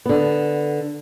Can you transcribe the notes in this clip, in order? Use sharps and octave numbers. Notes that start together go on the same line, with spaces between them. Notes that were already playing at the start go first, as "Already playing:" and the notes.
D3 B3